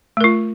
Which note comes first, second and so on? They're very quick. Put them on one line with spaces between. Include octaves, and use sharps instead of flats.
A3 A#4 F4